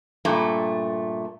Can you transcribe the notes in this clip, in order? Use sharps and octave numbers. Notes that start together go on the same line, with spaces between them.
G2 A#2 A3